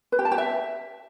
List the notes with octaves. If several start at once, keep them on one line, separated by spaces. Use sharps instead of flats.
B4
G4
A5
G4
E5